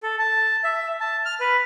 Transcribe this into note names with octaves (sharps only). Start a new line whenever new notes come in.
A4
A5
E5
A5
F6
B4